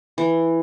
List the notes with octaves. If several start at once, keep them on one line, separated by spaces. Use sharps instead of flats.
E3